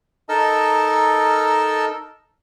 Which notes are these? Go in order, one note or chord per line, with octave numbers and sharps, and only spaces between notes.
D#4 A4 A#4 D#5 A5 E6